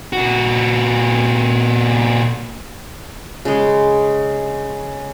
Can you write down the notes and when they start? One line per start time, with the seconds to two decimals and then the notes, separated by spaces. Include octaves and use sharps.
0.13 A#2 F#4
3.45 C#3 G#3